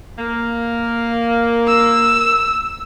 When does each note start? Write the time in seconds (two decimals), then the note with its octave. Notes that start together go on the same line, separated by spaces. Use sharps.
0.19 A#3
1.68 E6